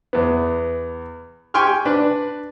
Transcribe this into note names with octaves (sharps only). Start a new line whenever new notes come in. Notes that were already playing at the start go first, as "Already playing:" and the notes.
E2 B3
G4 G5 G#5 C6 C#6 F6
D4 B4